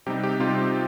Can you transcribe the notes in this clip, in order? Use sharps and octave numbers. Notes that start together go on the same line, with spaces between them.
C3 G3 C4 D#4 G4
G4
C3 G3 C4 D#4 F4